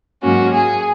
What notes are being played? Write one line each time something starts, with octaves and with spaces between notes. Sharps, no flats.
G#2 F#3 A#3 C#4 F#4
G#4